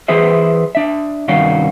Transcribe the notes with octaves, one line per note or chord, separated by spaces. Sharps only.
E3 G#4 B4 C5 E5
D4 E5
C2 G2 D#3 C#4 F#4 F5